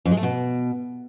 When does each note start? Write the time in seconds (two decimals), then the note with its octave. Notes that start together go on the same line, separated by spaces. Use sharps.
0.05 F2
0.11 G#3
0.17 A3
0.23 B2